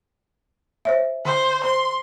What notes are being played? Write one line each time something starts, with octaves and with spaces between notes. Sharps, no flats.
C5 C#5 E5
D3 C5
C5 C6